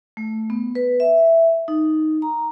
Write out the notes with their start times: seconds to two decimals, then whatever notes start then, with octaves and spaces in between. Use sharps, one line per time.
0.17 A3
0.50 B3
0.75 B4
1.00 E5
1.68 D#4
2.22 A#5